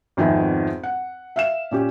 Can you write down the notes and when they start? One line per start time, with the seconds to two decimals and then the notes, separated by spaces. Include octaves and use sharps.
0.17 G#1 F2 D#3 B3 G#4 E5
0.83 F#5
1.36 E5 F5 E7
1.71 A#2 C#4 G4